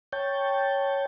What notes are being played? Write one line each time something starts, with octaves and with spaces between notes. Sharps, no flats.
C#5 G5 A5